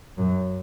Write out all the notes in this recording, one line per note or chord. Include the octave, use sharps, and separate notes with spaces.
F#2